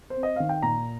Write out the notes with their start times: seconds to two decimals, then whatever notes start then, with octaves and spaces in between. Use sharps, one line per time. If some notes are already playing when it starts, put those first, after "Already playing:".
0.10 C5
0.16 C4
0.23 D#5
0.36 D#3 F5
0.49 G5
0.62 A#2 A#5